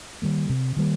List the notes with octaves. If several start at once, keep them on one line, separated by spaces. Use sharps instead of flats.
D#3 G3 A#3
C3
D#3 G3 A#3